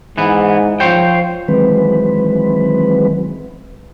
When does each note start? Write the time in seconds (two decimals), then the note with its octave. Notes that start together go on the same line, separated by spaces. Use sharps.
0.18 G#2 E3 B3
0.80 F3 C5 C#5 G5
1.48 D#3 E3 F#3 G#3 C4 B4